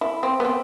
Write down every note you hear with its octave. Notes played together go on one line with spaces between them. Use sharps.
E4
C4
B3
C4